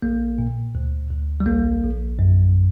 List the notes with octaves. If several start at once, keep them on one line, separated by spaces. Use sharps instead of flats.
A#1 A#3
A#2
D2
D2
G3
A#1 A#3
A#1
F#2